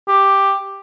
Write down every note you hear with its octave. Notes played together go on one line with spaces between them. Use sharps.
G4